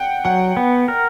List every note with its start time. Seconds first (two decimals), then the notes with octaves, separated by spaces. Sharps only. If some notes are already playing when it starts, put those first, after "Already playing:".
Already playing: F#5 G5
0.25 F#3 F#5
0.57 B3
0.88 A#4